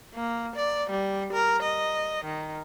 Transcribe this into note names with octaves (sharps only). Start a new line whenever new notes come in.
A#3
D5
G3
A#4
D#5
D#3